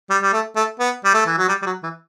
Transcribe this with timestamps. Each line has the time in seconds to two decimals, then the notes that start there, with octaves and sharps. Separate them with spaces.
0.10 G3
0.22 G3
0.33 A3
0.56 A3
0.80 B3
1.05 G3
1.14 A3
1.26 E3
1.38 F#3
1.49 G3
1.62 G3
1.66 F#3
1.83 E3